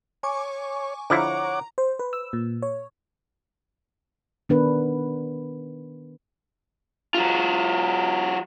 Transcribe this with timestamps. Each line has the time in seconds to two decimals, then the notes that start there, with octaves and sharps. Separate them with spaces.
0.23 C#5 G#5 C#6 D6
1.10 D3 F3 E4 C#5 F#5 A#5 D6
1.78 C5
1.99 B4
2.13 E6
2.33 A#2
2.62 C#5
4.49 D#3 B3 D4 A#4 B4
7.14 F#3 F4